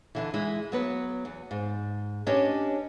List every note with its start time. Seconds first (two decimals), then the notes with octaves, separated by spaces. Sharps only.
0.15 B2 D3 E3
0.34 E3 G#3 E4
0.72 F#3 B3 B4
1.25 E2
1.51 G#2
2.27 C#4 D4 G4 B4 C#5 D#5